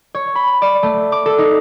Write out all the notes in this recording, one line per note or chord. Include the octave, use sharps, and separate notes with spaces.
C#5
B5
D5
A3
D6
A4
D#4